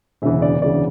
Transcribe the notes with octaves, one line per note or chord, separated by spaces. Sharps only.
E1 D2 C#3 E3 E5
D5
E1 D2 C#3 E3 D5